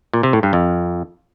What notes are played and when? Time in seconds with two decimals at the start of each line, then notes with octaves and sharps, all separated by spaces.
0.14 A#2
0.23 C3
0.33 A2
0.43 G2
0.53 F2